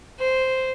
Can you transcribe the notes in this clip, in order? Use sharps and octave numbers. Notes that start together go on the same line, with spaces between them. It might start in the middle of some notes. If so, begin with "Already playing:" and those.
C5